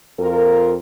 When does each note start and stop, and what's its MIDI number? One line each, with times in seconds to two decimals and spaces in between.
0.19 0.76 41
0.19 0.76 65
0.19 0.76 70